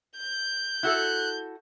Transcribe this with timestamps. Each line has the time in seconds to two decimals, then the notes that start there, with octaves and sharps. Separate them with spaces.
0.18 G6
0.83 E4 F#4 A4 F#6